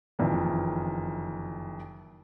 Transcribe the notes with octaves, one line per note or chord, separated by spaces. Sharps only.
F#1 F2 D#3 E3